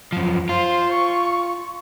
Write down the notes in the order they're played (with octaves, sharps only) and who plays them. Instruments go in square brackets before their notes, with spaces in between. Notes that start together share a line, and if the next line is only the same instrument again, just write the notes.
[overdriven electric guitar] F#2 F3
[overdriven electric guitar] F4 [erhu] C5
[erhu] C#6